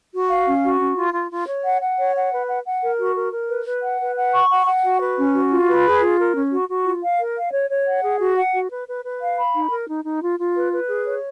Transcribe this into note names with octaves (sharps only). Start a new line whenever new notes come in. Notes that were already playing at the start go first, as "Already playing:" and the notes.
F#4
F5
C#4
F#4
C#4
F4
F4
F4
C#5
F#5
F#5
C#5
F#5
B4
F#5
F#5
A#4
F#4
A#4
A#4
B4
B4
F#5
B4
F#5
C#6
F#5
F#5
F#4
B4
C#4
F#4
F4
B4
G#4
F4
A#4
C#4
F#4
F#4
F4
F5
A#4
F5
C#5
C#5
F#5
G#4
F#4
F#5
F#4
B4
B4
B4
F5
B5
D#4
A#4
D#4
D#4
F4
F4
B4
B4
G#4
C#5